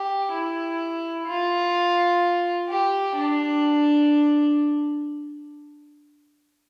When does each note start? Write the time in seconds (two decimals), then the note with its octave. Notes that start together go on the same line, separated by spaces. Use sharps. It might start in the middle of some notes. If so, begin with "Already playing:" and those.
Already playing: G4
0.32 E4
1.27 F4
2.69 G4
3.16 D4